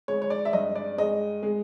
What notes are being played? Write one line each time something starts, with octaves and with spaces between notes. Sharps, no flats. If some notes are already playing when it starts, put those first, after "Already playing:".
G#3 C#5
C#5
D5
E5
G2 D#5
D5
G#3 D#5
G#3